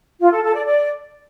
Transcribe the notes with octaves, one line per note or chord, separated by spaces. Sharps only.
F4
A4
A4
D5
D5